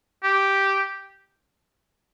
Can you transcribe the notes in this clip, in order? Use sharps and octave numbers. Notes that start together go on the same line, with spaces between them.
G4